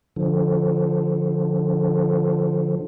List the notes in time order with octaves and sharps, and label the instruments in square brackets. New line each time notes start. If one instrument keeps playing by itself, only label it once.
[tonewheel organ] D3 F3